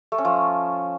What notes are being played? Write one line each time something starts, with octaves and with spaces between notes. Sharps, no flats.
A3
C#4
F3